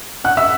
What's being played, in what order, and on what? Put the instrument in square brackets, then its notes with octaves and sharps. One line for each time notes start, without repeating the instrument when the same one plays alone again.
[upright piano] F#5 F#6
E5 E6